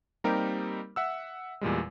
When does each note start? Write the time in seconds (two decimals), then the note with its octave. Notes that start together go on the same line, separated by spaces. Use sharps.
0.24 G3 A#3 C4 D#4 G4 A#4
0.96 E5 F#5 E6
1.61 E2 A#2 G3 G#3